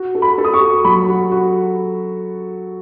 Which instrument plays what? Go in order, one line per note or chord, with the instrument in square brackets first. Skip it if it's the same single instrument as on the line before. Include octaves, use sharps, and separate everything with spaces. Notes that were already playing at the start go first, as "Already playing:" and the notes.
Already playing: [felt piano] F#4
A4
[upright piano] B5
[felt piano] A4
[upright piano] D#6
C#6
[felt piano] F#4
[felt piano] F#3 [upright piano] B5
[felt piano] F#4
F#4